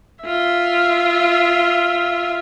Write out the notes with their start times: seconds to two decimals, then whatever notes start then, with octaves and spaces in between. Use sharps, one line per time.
0.24 F4 E5